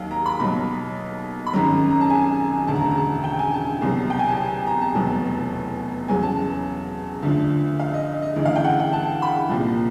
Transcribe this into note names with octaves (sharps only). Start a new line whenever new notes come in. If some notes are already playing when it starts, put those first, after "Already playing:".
Already playing: D#2 D#3 F#3 F5
A#5
B5
B1 B2 F#3 B5
B5
G#1 F#2 D#3 F#3 A#5
A#5
A5
G#5
E1 D2 C#3 A5
A#5
A5
A#5
A5
G5
G#5
A5
C2 B2 F#3
G5
G#5
A5
A#5
A5
F1 E2 B2 F#3 A5
E2 C#3 F#3 G#5
A5
D2 D3 F3
F5
D#5
D#5
D2 C#3 E3
F5
G5
F#5
G5
A5
B5
C2 A#2 F3